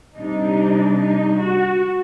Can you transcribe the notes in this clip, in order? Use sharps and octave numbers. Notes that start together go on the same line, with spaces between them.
C3 G3 D4 D#4
D#4
F#4